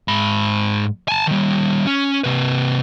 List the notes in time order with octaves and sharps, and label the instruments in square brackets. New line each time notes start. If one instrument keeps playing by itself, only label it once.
[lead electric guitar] G#2 B5
G#5 A5
D#3 G3
C#4
C3 B4